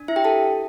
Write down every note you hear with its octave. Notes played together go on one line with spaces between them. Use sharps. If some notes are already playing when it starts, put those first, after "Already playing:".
Already playing: D4
E4 E5
G4 G5
A4 A5